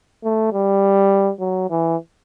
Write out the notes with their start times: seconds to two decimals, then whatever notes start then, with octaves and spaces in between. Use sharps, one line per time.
0.24 A3
0.53 G3
1.40 F#3
1.70 E3